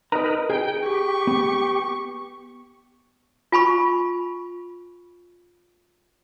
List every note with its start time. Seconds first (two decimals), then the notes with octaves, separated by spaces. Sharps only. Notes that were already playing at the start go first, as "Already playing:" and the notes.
0.12 D#4 A#4 B4 D#5 A#5
0.50 G#4 G5
0.86 G4 C#6
1.27 B3
3.52 F4 G#5 B5 C#6